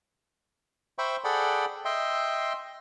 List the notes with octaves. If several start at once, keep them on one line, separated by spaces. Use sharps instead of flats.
C5 E5 G5 B5 C#6
G#4 A4 D5 F#5 G5 B5
D#5 E5 G5 C6